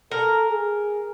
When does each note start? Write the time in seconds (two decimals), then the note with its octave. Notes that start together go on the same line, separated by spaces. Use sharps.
0.11 A4 A#4
0.50 G#4